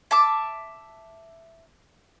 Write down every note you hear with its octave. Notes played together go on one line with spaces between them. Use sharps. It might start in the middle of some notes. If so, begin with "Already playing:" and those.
E5 A5 D6